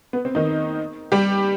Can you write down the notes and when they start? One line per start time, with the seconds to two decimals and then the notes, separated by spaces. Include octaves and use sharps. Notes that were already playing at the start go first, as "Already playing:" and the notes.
0.13 B3
0.25 C4
0.35 D#3 D#4
1.12 G3 G4